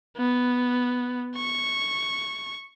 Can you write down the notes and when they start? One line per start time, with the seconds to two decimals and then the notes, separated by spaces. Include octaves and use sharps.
0.18 B3
1.36 C#6